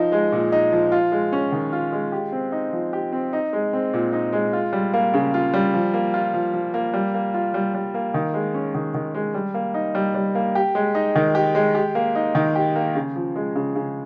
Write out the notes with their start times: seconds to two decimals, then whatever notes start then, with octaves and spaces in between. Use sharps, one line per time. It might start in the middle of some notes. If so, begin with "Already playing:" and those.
Already playing: F3 D#4
0.12 G#3
0.32 A#2
0.52 D#4
0.72 F3
0.92 F4
1.12 G#3
1.33 C#4
1.52 D#3
1.73 F4
1.93 G#3
2.12 G4
2.32 C4
2.52 D#4
2.73 F3
2.93 G4
3.12 C4
3.33 D#4
3.53 G#3
3.73 C4
3.93 A#2
4.13 D#4
4.33 G#3
4.53 F4
4.73 G3
4.93 A#3
5.14 C#3
5.34 F4
5.54 G3
5.74 F3
5.94 A#3
6.14 F4
6.34 F3
6.54 F3
6.74 A#3
6.94 G3
7.14 A#3
7.34 F4
7.54 G3
7.74 G3
7.94 A#3
8.14 D#3
8.34 G#3
8.54 C#4
8.75 D#3
8.94 D#3
9.15 G#3
9.34 G3
9.54 A#3
9.74 D#4
9.95 G3
10.15 G3
10.35 A#3
10.55 G4
10.75 G#3
10.95 D#4
11.15 D#3
11.35 G4
11.55 G#3
11.75 G4
11.95 A#3
12.15 D#4
12.35 D#3
12.55 G4
12.76 A#3
12.95 C#3
13.16 F3
13.36 G#3
13.55 C#3
13.76 C#3